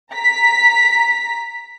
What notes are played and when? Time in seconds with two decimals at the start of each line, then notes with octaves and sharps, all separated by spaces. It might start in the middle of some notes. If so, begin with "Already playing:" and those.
0.14 A#5 B6